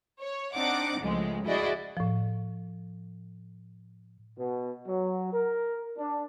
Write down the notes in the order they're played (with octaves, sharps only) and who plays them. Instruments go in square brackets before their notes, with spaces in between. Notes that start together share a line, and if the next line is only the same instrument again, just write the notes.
[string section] C#5
C4 D4 D#4 F#5 D6
C#2 A2 F3 G#3
E4 F#4 G#4 D5 D#5
[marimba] A2 F3
[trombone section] B2
F#3
A#4
D4